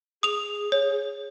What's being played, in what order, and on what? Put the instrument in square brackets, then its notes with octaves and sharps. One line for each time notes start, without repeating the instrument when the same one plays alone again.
[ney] G#4 [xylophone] D#6 F7
[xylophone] C#5